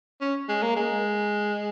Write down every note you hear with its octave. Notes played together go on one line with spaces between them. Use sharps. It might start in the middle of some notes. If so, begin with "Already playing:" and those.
C#4
G#3
A#3
G#3